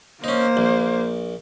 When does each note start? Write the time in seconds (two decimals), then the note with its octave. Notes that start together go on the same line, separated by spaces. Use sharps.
0.24 A#3 C#4 D#4 C5
0.57 A#1